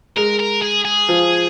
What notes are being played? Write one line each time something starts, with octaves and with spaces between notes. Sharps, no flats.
G#3 A#4
A#4
G#4
G#4
F3